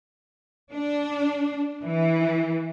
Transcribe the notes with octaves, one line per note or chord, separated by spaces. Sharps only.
D4
E3